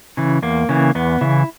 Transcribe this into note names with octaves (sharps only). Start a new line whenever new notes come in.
C#3 E3
E2 A#3
C#3 E3
E2 B3
C#3 E3 E4